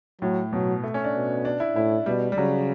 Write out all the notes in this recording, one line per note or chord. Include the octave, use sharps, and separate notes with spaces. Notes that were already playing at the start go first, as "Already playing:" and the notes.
A2 F#3
B2 F#3
A3
C#4
D4
B2
D4
E4
A2 E4
B2 G3
G3
C#3 F#3